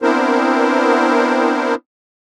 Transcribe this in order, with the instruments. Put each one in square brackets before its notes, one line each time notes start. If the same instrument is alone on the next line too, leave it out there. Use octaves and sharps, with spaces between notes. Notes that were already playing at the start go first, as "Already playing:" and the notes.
[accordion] B3 C4 D4 E4 A#4 C5